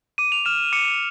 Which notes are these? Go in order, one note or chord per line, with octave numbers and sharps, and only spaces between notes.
D6 D#7
F7
F6 E7
D6 C#7